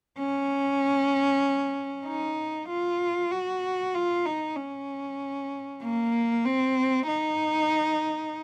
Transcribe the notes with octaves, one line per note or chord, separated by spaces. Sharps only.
C#4
D#4
F4
F#4
F4
D#4
C#4
A#3
C4
D#4